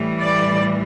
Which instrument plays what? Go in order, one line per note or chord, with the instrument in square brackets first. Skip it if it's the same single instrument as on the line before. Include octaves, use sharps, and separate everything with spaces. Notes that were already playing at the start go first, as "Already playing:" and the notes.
Already playing: [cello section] A2 E3 G3
D5